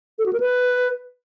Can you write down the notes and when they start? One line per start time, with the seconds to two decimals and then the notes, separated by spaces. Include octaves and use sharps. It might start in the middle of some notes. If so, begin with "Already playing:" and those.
0.19 A4
0.26 F#4
0.33 A#4
0.40 B4